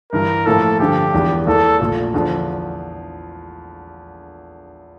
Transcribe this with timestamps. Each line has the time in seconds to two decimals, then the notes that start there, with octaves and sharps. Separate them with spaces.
0.13 G2 E3 G3 A#4
0.46 A2 F3 A#3 E4 A4
0.80 G2 D3 F3 G4
1.14 E1 E2 E3 G3
1.47 E2 E3 A#3 A4
1.80 A#1 A#2 A3
2.14 E2 D3 F3